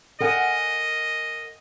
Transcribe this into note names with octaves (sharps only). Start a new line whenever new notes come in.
A#4 D#5 F#5 G#5